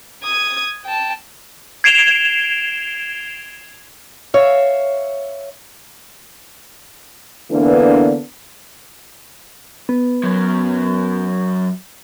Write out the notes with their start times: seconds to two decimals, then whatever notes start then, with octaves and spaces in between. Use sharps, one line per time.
0.24 D#6 G#6
0.84 G5 A5
1.84 G#6 C7 D7 E7 F7 G7
4.34 C#5 E5 F5
7.51 D3 E3 A#3 B3 D4 B4
9.89 B3
10.23 F#2 F#3